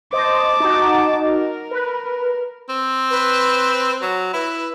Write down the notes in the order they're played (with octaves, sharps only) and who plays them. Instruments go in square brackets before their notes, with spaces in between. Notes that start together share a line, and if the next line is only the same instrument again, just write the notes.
[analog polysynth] C5 D#5 [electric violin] A5 D6
[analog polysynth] D#4 F#4
[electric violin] A#4
[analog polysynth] B4
[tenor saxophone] C4
[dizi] B4
[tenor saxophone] F#3
[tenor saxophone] E4 [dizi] B4